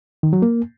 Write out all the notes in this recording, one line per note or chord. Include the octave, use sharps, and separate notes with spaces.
D#3
F#3
A#3